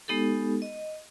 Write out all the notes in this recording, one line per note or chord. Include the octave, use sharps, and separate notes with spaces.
G#3 B3 D#4 G4 A4
D#5